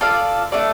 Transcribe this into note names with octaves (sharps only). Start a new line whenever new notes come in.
F4 A4 D5 F5
A3 D4 A4 D5